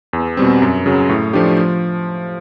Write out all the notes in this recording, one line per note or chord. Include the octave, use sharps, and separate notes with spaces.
E2
B2 G3 C4
F#2
C#3 F#3
A2
F3 A3 D4 G4
F3